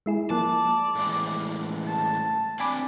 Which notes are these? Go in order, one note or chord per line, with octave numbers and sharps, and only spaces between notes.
G#3 E4 G#4
F3 A#3 D5 A5
A2 E3 G#3
A5
C4 D4 D5 G#5 B5 D6